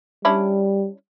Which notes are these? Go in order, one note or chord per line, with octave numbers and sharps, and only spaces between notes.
G3 C#4 D4 E4